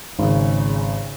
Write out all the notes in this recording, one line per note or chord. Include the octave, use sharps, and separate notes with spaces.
G#1 C#3